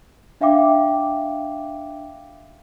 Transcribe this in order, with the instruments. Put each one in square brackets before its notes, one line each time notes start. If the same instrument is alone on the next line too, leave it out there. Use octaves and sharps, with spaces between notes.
[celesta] D4 E5 F5 G5 D6